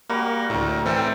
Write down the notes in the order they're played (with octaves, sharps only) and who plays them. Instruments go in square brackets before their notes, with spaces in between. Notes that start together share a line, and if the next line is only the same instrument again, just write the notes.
[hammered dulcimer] G3 F#4 A#4 [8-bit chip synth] A#3
[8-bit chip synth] D2 A2 [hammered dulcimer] A#4 C5 F5
[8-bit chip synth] A2 E3 C4 [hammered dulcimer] A4 G5